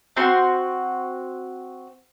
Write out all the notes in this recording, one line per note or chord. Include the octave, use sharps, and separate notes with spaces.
C4 F#4 C6 G6